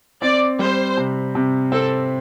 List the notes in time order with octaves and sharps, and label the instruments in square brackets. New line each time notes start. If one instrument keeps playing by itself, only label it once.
[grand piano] C4 [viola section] D5
[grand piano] G3 [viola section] C5
[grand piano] C3
C3
[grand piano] C4 [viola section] A4